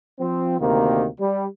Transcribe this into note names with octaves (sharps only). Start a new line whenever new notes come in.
F3 C4
D2 C3 D#3 A#3
G3